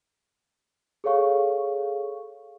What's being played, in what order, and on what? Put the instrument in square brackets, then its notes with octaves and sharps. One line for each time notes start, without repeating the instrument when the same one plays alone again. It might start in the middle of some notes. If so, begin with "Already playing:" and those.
[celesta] G#4 A4 C#5 F5 C#6